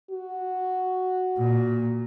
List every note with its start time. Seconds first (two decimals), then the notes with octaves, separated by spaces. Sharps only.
0.10 F#4
1.38 A#2